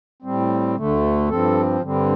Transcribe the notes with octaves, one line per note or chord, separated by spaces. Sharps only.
A2 G3 C4
D2 D3 A3
G2 F3 C4 A4
G2 D3 G3 C4